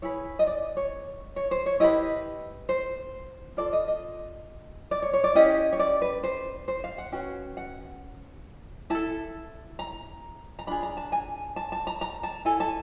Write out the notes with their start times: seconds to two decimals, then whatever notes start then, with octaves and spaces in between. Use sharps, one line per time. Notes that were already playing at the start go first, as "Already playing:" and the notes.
0.02 E4 G#4 B4 C#5
0.39 D#5
0.47 D5
0.77 C#5
1.36 C#5
1.51 C5
1.66 C#5
1.80 E4 G4 B4 D#5
2.69 C5
3.57 F4 A4 D5
3.73 D#5
3.87 D#5
4.91 D5
5.02 C#5
5.13 C#5
5.24 D5
5.35 C#4 E4 G4 D#5
5.72 C#5
5.79 D5
6.02 B4
6.23 C5
6.68 C5
6.84 F5
6.98 F#5
7.12 C#4 F#4 B4 G5
7.57 F#5
8.90 E4 A4 A5
9.79 A#5
10.59 A#5
10.67 D4 F4 G#4 B5
10.83 A#5
10.97 A5
11.12 G#5
11.56 A5
11.72 A5
11.87 A#5
12.01 A#5
12.23 A5
12.45 E4 A4 G#5
12.60 A5